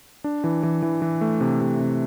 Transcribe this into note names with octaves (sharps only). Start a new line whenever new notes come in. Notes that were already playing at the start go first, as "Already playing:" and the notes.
D4
E3
E3
E3
E3
A3
C3
C3
C3